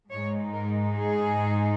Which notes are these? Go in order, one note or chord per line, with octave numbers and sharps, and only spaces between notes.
G#2 G#3 D#4 C#5
A#4
G#4